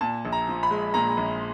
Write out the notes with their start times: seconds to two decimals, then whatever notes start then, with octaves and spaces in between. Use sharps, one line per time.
0.01 A#2 A5
0.25 A#1
0.32 A#5
0.48 F3
0.63 B5
0.71 G#3
0.94 A#2 A#5
1.17 A#1